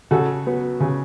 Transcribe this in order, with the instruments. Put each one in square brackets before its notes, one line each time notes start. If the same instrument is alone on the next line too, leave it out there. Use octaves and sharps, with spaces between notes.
[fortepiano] C#3 F#4 A4
F#3 B3
C#3